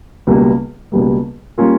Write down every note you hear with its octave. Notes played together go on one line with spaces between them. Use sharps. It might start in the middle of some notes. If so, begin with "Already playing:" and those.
C#2 B2 G3 A#3
C#2 B2 G3 A#3
G3 A#3 C#4 F4 A#4